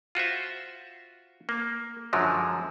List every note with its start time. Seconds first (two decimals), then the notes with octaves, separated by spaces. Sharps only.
0.15 F4 F#4 C5 E5
1.49 A#3
2.13 F#2 D3 F3 F#3 G#3